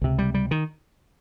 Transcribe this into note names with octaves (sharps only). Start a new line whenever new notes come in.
C#2 C3
G3
G3
D#3